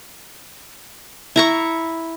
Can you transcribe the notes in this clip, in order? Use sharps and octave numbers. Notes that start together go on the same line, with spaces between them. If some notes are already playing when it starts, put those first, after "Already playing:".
E4 A#5 C#6